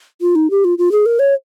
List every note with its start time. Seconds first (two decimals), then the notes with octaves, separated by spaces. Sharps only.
0.21 F4
0.35 D#4
0.51 G4
0.64 F4
0.78 F4
0.92 G#4
1.06 A#4
1.19 C#5